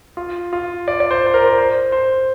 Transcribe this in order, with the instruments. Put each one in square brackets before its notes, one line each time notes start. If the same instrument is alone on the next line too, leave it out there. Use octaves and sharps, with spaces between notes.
[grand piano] F4
F4
D5
D5
C5
C5
A#4
C5
C5